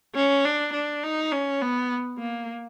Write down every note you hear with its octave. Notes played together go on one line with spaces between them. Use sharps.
C#4
D4
D4
D#4
C#4
B3
A#3